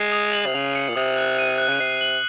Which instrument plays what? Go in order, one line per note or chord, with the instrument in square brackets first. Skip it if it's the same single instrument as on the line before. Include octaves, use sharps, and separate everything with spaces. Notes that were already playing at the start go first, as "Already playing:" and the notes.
Already playing: [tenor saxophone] G#3 [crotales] C7
[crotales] D#6
F#7
[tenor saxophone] C3
[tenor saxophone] C#3 [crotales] F7
[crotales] C#7
[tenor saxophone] A#2
[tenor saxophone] C3 [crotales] D#6
[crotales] F#6
D#7
F#6
[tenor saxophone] C#3
[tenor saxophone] C3 [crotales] C7
[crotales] F#7